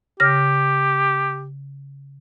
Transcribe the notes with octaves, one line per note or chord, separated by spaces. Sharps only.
C#3 G4 F6 A#6